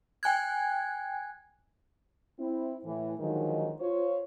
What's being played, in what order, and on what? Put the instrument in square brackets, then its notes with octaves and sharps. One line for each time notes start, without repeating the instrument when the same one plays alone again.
[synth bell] G5 G#5 F#6 G#6
[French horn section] C4 E4
A2 E3
D3 D#3 F3 F#3 G#3 D#4
F4 C5 C#5